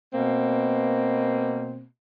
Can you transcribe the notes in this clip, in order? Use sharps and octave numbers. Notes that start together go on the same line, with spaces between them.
B2 A#3 C4